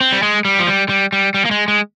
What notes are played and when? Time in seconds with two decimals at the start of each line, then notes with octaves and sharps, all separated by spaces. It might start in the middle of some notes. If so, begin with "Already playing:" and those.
0.01 C4
0.13 G3
0.23 G#3
0.45 G3
0.59 F3
0.67 G3
0.89 G3
1.13 G3
1.34 G3
1.45 A#3
1.51 G#3
1.68 G#3